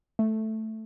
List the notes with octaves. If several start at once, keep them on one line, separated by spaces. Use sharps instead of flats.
A3